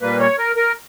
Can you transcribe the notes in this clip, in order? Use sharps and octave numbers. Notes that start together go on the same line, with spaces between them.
A#2 G3 A#3 B4
C#5
A#4
A#4